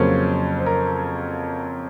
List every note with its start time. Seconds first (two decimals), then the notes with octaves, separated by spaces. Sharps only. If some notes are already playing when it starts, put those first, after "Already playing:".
Already playing: F2 C#3 F#3 A#3 C#4 C5
0.58 C5
0.66 A#4